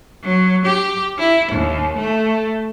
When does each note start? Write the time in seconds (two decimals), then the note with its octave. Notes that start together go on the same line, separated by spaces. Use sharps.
0.23 F#3
0.66 G4
1.19 E4
1.52 D#2
1.97 A3